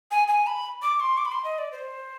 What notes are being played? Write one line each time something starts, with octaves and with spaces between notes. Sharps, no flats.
G#5
G#5
B5
D6
C6
D6
B5
C6
D#5
D5
C5